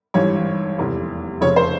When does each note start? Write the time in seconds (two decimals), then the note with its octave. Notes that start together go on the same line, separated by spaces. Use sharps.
0.14 G#1 G2 E3 C#5
0.78 F1 E2 C3
1.41 F1 F2 C#3 C#5
1.56 C5